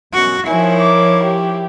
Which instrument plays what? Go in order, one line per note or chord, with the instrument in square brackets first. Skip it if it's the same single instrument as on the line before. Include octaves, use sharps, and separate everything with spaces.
[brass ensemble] F#2 B2 [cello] F#4
[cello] F3 E4 [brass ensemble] D#4 A#4 C#5 [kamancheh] G#5
[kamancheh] D6
G4